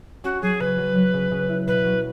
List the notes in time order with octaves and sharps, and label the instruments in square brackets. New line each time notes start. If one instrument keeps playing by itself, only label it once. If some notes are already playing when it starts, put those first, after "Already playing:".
[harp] C#4 [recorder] F#4
[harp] F#3 [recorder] G#4
[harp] C#3 [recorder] B4
[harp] F#3
F#3
C#3
C#3
E4
[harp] B2 [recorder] B4
[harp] F#3